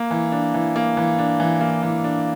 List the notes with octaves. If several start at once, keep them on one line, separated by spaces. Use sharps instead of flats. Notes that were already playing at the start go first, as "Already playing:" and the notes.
Already playing: A#3
E3
D4
E3
A#3
E3
D4
E3
A#3
E3
D4